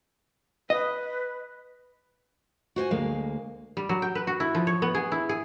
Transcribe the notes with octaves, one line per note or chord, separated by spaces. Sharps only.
B4 D#5
F#4 C5 G5 G#5
D2 G#3 A#3 F5
G3
F#3
G5
B4
F#4
E4
F3
C#5
B3
G#4
E4
G#4